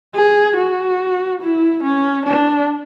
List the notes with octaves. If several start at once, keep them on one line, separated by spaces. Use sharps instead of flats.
G#4
F#4
E4
C#4
D4